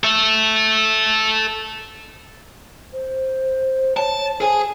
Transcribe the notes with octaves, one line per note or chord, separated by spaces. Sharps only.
A4 E5
C5
C#5 A5
G#4 C5 G#5